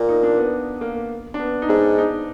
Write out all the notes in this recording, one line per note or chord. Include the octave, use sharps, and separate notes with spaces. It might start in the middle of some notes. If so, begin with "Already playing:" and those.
Already playing: A#2
D#4
D4
B3
A#3
D4
B3
D#4
G#2 D4
D#4